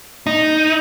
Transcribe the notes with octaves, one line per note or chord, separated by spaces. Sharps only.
D#4